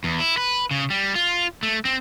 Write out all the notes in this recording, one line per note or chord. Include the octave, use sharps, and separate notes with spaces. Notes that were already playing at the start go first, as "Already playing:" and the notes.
E2
E4
B4
C#3
G3
F4
A3
C4